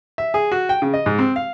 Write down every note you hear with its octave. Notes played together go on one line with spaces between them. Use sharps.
E5
G#4
F#4
G5
C#3
D#5
G#2
C4
F5